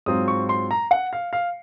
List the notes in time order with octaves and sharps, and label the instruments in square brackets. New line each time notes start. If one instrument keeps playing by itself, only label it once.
[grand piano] G#2 F#3 C4 F4 D#6
C#6
C6
A#5
F#5
F5
F5